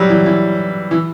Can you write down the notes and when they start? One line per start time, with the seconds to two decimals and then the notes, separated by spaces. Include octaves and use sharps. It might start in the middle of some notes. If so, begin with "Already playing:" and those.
Already playing: F#3 G3
0.10 E3
0.26 E3
0.91 E3